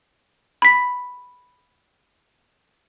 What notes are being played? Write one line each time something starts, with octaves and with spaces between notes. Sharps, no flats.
B5 B6